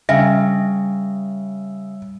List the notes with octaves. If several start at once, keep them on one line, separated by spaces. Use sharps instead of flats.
C#3 G3 E5